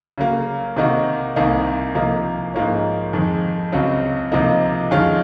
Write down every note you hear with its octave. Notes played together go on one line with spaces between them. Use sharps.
C#3 F#3 A#3
C3 D#3 A#3 D#4 F#4
C2 C3 D#3 A#3 D#4
C3 F3 A#3 D#4
G#2 F3 A#3 C#4
F2 D#3 G#3
C#2 C#3 F#3 C4
C#2 C3 F3 A#3 D#4
F2 D#3 G#3 C#4 F4